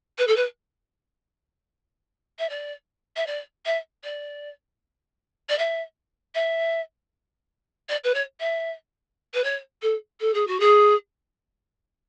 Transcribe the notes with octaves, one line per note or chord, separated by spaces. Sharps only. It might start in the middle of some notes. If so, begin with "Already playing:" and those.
B4
A4
B4
E5
D5
E5
D5
E5
D5
D5
E5
E5
D5
B4
C#5
E5
B4
C#5
A4
A4
G#4
F#4
G#4